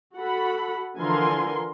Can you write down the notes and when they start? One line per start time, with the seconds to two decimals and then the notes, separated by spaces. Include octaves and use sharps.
0.15 F#4 A4 F#5 B5
0.99 D3 E3 F3 A#4 G#5 C6